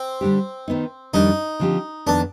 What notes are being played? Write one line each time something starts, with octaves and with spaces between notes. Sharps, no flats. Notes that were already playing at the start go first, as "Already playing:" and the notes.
Already playing: C4
D3 G3 D4 G4
D#3 B3 D#4
F2 D#3 G3 D4 D#4
D3 F3 C4 G4
F2 D#3 B3 D4